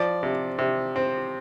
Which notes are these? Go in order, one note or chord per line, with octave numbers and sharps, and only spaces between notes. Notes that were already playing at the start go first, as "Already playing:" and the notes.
Already playing: F3 D5
C3
C3
C4